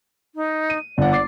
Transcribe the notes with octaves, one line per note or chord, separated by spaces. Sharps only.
D#4
D#7
G1 D5 F#5
D6 A6 C7